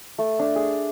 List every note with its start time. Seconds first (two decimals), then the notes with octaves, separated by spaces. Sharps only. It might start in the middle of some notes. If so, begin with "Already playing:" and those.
0.19 A3
0.39 D4
0.56 G#4